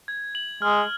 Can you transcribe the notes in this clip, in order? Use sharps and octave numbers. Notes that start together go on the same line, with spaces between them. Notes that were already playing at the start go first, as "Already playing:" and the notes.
G#6
F#7
G#3 F6